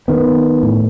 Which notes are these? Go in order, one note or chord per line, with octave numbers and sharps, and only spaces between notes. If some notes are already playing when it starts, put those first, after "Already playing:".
D#3 B3
A2